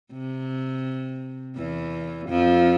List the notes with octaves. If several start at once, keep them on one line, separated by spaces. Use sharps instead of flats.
C3
E2 E3
F2 F3